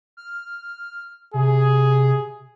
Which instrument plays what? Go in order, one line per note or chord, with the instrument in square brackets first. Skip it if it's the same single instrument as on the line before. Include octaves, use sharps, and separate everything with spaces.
[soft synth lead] F6
[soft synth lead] C3 [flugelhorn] G#4